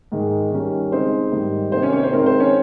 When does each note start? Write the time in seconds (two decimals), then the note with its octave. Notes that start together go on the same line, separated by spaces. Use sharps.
0.12 G#2 D#3 G#3
0.51 D#3 G3 C#4
0.91 C#3 G#3 C4 D#4 C5
1.32 G#2 D#3 G3
1.72 C3 D#3 A#3 D#4 C5
1.82 C#4 C#5
1.92 C#4 C#5
2.03 C5
2.13 D#3 G#3 C4 A#4
2.26 C5
2.40 C#4 C#5